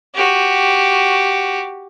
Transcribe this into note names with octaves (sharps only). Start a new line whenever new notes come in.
F#4 G4